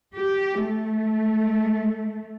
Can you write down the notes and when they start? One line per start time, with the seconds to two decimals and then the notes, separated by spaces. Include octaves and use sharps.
0.14 G4
0.64 A3